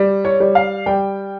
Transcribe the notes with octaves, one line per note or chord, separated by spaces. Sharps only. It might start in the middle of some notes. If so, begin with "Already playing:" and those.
Already playing: G3
C#5
G3
F5
G3 G5